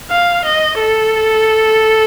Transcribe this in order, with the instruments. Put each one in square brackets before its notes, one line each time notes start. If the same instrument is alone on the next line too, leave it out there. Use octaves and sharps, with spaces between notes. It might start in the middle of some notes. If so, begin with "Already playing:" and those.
[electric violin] F5
D#5
A4